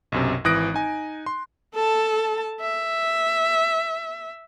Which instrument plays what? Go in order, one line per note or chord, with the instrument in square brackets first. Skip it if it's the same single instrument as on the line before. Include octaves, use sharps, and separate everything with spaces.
[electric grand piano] B1 F#2 C3
G#1 E3 D#6 F#6 A#6 D7
D#4 G#5
C6
[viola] A4 A5
E5